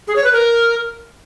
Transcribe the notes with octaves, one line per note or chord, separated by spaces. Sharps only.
G#4
C#5
B4
A#4